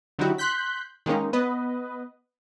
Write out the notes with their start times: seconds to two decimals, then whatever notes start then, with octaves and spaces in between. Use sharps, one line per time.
0.19 D3 F#3 D#4 E4 F#4 G4
0.38 C6 F#6 G6 B6
1.06 D#3 G#3 A#3 C#4 D#4
1.33 B3 B4 D#5